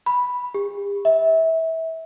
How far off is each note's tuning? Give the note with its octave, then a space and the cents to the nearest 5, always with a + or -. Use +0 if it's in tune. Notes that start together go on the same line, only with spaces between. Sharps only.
B5 -5
G4 +45
E5 -25